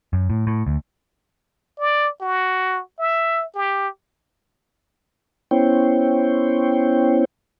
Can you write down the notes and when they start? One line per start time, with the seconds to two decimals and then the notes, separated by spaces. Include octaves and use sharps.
0.13 F#2
0.30 A2
0.47 A2
0.67 D2
1.79 D5
2.21 F#4
2.99 E5
3.55 G4
5.51 B3 C#4 E4 C5 C#5 G5